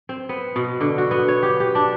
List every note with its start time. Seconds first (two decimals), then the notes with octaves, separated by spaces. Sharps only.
0.09 C4
0.29 B3
0.56 B2
0.81 D3
0.98 F#4
1.11 B3
1.28 C#5
1.43 G4
1.60 G4
1.75 D4